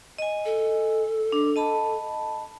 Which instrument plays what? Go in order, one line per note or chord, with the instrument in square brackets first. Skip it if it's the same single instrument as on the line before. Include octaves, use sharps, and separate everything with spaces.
[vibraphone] D#5 G#5
[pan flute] A4
[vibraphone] D4
D#5 A5 B5